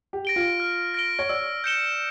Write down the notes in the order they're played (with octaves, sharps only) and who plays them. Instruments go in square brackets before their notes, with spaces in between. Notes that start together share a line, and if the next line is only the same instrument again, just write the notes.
[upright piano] G4
[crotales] A#6 D7 G7
[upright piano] F4
[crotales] F6
A#6 D7 G7
[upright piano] C#5
[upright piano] D5 [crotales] E6
[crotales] G6 C#7 E7 G7